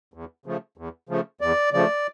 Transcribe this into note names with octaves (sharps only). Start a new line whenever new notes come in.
E2
C#3 F3 A3
E2
C#3 F3 A3
E2 D5
C#3 F3 A3 D5